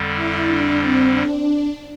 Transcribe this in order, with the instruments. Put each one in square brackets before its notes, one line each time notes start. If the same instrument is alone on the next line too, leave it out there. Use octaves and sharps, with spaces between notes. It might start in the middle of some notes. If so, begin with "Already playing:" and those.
Already playing: [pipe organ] F2 D3 G3
[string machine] E4
D4
C4
D4